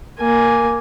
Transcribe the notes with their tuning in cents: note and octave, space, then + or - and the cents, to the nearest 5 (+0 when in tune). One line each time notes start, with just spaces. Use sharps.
A#3 +0 G#5 +0